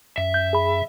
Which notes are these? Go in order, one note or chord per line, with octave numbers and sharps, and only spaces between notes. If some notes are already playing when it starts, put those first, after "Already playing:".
F#2 E5
G6
G#4 B5